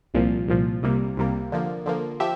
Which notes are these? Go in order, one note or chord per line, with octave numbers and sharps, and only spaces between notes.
C2 A#2 F3
C2 A#2 F3
C2 C3 G3 A#3
C2 C3 G3 A#3
D3 F3 A#3
D3 F3 A#3
F3 G4 E5